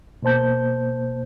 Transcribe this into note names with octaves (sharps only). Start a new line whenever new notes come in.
B2 A#3 C5 A5 G6